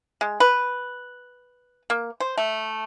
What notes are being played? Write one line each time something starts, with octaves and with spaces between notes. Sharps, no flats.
G#3
B4
A#3
C5
A3